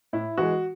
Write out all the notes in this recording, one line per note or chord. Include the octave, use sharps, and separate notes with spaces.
A2 E4
E3 G#3 F#4